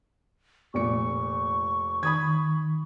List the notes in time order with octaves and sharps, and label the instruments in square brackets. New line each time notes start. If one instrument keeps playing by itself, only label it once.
[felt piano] F1 A#2 C#7 [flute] C#6
[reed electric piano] D#3 [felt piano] B5 D#6 G#6